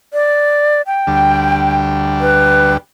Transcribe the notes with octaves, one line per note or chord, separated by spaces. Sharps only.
D5
G5
D2 G3
B4